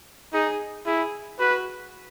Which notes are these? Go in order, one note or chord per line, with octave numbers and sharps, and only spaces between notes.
D#4 G#4
E4 G#4
F#4 B4